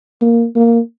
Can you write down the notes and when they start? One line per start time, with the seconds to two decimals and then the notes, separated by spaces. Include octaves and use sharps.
0.22 A#3
0.56 A#3